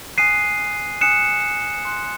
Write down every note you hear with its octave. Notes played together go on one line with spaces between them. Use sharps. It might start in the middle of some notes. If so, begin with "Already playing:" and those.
G#5 D#6 F#6 C7 D#7
G#5 D#6 F#6 C#7 E7
C6 F#6